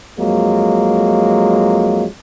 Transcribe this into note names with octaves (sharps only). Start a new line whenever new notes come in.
F2 F#3 G#3 A#3